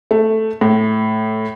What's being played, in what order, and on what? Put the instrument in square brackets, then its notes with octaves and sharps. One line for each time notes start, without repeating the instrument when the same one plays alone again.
[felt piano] A3
A2